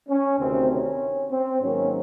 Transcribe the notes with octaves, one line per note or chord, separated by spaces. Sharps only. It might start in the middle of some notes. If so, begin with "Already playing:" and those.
C#4
D2 C3 D#3 C4
C#4
C4
G#2 D#3 F#3 A#3 C#4